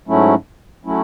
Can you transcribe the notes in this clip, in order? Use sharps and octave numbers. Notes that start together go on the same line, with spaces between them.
G#2 F#3 A3 C#4 E4
F#3 A3 C#4 E4